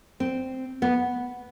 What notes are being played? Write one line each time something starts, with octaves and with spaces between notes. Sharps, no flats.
C4
B3